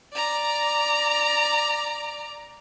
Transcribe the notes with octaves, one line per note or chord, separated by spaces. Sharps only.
D5 A#5